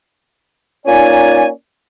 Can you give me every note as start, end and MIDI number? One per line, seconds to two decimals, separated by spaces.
0.86 1.47 58
0.86 1.47 61
0.86 1.47 63
0.86 1.47 65
0.86 1.47 74
0.86 1.47 80